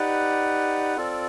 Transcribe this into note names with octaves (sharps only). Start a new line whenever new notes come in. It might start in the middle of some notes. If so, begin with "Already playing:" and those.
Already playing: D#4 G4 B4 D5 F#5
C4 F4 A4 D5